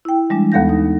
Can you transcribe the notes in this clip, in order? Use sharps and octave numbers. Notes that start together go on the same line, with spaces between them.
E4 G5
E3 G3 G#3 D4
D#2 B3 A4 F5 G6 A#6
D#4